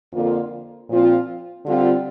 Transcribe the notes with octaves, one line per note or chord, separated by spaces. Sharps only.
F2 D3 A#3 F4
A#2 F3 C4 F4
D3 G3 C4 F4